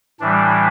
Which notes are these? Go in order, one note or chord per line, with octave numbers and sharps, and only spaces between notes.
A2 E3 G3 D4